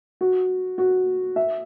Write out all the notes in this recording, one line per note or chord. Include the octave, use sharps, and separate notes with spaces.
F#4
F#4
E5